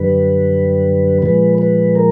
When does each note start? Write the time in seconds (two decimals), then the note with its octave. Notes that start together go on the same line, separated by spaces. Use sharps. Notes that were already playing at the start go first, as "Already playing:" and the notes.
Already playing: F#2 D3 G3 B4
1.22 A#2 F3 G#3 B4
1.58 B4
1.95 A#4